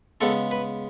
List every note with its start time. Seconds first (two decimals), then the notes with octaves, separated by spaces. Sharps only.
0.21 C#3 G#3 B3 A4
0.51 B4